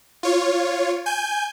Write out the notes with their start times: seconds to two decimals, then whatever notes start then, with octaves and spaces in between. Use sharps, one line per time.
0.23 F4 C#5
1.06 G#5 G6